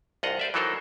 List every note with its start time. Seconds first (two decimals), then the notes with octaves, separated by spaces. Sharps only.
0.23 C2 G2 F4 D#5 F#5 A#5
0.39 C5 D5 E5
0.54 E3 F#3 D#4 A4 A#4 C5